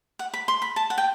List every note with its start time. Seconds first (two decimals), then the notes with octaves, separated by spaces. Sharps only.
0.19 F#5
0.34 B5
0.48 C6
0.62 B5
0.76 A5
0.90 F#5
0.98 G5